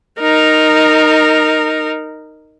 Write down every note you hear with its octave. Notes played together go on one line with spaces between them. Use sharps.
D#4 A#4